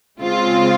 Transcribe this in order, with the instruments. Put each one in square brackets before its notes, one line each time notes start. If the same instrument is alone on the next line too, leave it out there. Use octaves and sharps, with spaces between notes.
[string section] C#3 G#3 C4 F4